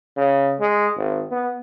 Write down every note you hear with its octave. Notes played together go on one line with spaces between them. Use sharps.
C#3
G#3
G#1
B3